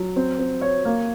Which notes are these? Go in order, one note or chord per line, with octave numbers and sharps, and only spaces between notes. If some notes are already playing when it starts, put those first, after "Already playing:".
Already playing: F#3
C4
C4
C#5
A#3